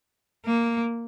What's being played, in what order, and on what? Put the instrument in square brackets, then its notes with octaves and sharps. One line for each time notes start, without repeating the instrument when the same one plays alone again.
[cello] A#3